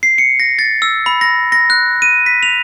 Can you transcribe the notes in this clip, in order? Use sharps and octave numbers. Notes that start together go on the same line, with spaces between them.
C7
C#7
A#6
A6
E6
B5
A#6
A#6
F#6
D#7
B6
F7